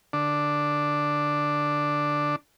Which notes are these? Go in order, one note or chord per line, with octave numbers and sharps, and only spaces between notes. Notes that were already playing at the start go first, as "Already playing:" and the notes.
D3 D4